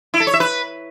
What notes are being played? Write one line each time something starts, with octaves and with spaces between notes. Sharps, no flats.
E4
A4
C#5
E5
B4